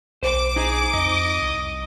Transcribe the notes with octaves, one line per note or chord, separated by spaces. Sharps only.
B1 C5 D6
D#4 G#4
F2 D#5
C2